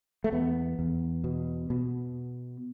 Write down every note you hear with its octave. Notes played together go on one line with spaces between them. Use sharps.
A3
E2 B3
E2
B2
B2